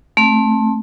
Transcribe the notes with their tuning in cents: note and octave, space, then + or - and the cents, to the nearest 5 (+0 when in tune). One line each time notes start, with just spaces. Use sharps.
A3 +0 C4 +30